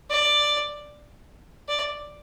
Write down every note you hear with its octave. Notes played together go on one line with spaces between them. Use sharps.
D5
D5